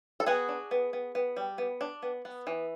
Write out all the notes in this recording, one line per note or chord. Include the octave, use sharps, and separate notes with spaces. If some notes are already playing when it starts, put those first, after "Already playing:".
A4
B3 F#4 G#4
D4
B3
B3
B3
G3
B3
D4
B3
B3
E3